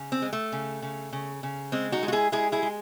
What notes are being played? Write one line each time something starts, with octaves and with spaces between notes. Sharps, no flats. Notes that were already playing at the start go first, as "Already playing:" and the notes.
Already playing: C#3
C4
G#3
A3
C#3
C#3
C#3
C#3
G#3 C4
D#4 F#4
G#3
F#4
E4 G#4
G#3 E4 G#4
E4 G#4
G#3